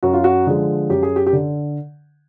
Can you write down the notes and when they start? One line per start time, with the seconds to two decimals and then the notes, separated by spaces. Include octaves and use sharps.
0.03 F#2 F#4
0.13 F4
0.24 F#4
0.47 D3 F3 G#3
0.89 F#2 G4
1.03 G#4
1.16 G4
1.27 G4
1.33 D3